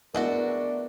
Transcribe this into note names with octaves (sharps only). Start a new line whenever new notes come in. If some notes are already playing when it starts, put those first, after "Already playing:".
G#3 A3 B3 D4 E4 F#4 A#4